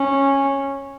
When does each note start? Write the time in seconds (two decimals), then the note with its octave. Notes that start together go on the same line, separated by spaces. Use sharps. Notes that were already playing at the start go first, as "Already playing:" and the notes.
Already playing: C#4